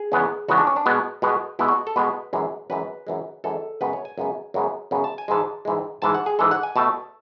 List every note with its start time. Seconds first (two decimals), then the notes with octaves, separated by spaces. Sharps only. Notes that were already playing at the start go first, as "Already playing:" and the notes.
Already playing: G#4
0.12 E2 C#3 G#3 B3
0.48 E2 C#3 G#3 B3 F#4
0.58 D4
0.67 C#4
0.76 D4
0.86 B2 G#3 B3
1.22 B2 G#3 B3
1.59 B2 G#3 B3 E4
1.68 F#4
1.87 A4
1.96 B2 G#3 B3 B4
2.33 F#2 E3 G#3
2.70 F#2 E3 G#3 B4
3.07 F#2 E3 G#3
3.44 F#2 E3 G#3 A4
3.81 F#2 C#3 G#3 B3 B4
3.93 C#5
4.05 G#5
4.18 F#2 C#3 G#3 B3
4.54 F#2 C#3 G#3 B3
4.91 F#2 C#3 G#3 B3
5.04 A5
5.18 G#5
5.28 G#2 E3 G#3 A5
5.65 G#2 E3 G#3
6.02 G#2 E3 G#3 A5
6.15 F#5
6.26 G#4
6.39 G#2 E3 G#3 A4
6.51 F#5
6.63 G#5
6.76 B2 A3 A5